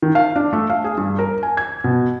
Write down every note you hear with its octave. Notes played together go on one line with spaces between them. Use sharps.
D#3
F5
D4
A3
F5
G#4
G2
A#4
G#5
G#6
B2